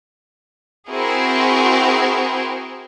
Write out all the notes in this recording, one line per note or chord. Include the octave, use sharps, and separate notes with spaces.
C4 E4 F#4 G#4 A#4